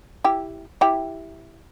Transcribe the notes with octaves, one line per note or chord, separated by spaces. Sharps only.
E4 G4
E4 G4